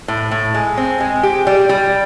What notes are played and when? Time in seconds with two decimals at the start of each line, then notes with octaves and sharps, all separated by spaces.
0.08 A2
0.31 A2
0.54 G#3
0.77 C4
1.00 G#3
1.23 G4
1.47 G3
1.69 G3